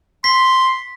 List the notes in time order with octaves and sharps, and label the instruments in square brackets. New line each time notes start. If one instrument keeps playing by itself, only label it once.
[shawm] C6 [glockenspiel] B6